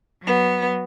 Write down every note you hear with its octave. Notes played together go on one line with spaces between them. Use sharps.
F#3 B3